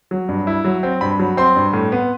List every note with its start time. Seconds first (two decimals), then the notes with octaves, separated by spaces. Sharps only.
0.11 F#3
0.29 G2
0.47 E4
0.64 F#3
0.83 C4
1.01 G2 B5
1.19 F#3
1.37 C4 C6
1.56 G2
1.73 A2
1.92 B3